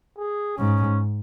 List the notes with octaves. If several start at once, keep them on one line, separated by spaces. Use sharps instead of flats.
G#4
G#2 C#4